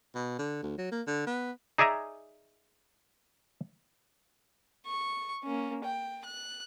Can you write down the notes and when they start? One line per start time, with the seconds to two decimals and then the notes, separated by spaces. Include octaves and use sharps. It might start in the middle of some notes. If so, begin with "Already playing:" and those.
0.15 B2
0.39 D3
0.63 D2
0.78 F#3
0.92 A#3
1.08 D3
1.27 B3
1.78 D#4 G#4 D5 E5 G#5 A#5
4.87 C#6
5.44 A#3 C#4
5.85 G5
6.25 F#6